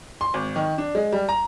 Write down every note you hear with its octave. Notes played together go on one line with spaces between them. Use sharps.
C6
G#1
D#3
D4
G#3
G3
A#5